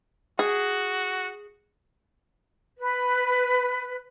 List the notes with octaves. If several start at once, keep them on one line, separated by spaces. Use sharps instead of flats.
F#4 G#4
B4